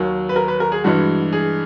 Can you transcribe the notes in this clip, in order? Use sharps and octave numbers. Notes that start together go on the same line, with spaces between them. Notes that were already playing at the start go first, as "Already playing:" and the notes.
Already playing: D#2 D#3 F#3
B4
A#4
B4
A#4
G#4
G2 E3 G#3 F#4
G#4